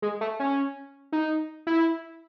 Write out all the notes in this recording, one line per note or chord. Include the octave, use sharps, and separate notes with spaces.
G#3
A3
C#4
D#4
E4